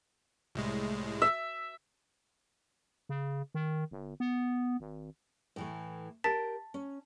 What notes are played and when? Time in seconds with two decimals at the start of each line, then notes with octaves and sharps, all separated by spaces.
0.55 C2 A2 G#3
1.22 E5
3.09 C#3
3.55 D#3
3.91 G1
4.20 B3
4.80 G#1
5.56 A2 E3 A3
6.24 G4 A#4 A5 A6 B6
6.74 C#4